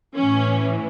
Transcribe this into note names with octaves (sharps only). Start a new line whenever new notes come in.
A2 E3 C#4